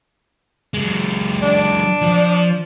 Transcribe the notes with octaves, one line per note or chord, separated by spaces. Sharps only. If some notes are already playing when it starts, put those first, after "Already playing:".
F#3 G#3
D4
F3